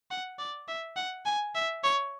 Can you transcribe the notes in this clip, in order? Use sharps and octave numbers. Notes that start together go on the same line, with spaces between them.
F#5
D5
E5
F#5
G#5
E5
C#5